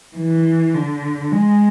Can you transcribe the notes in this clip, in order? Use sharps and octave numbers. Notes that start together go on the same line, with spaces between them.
E3
D3
G#3